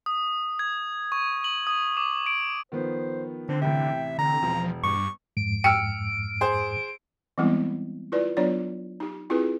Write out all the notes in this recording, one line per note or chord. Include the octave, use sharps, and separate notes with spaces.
D#6
G#6
C#6
F#7
D#6
D6
D7
D#3 F3 B3 C5
D3 C4 D4
A1 C3 E5 G5
D3 C4 A#5
E1 F3
G2 C#6 D6
F2 G#2 D7
G5 E6 F6 C#7
G#4 C5
E3 G3 G#3 B3 C4 E4
E4 F4 B4 D5
F#3 B3 D4 F4 C#5 D5
D#4 G4
C4 E4 F4 G4 G#4 B4